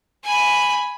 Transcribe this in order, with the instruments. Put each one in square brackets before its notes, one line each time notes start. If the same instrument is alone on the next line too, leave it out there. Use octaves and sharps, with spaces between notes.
[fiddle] G#5 B5